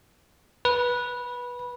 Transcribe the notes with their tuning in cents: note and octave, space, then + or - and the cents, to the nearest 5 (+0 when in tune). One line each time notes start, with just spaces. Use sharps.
B4 -15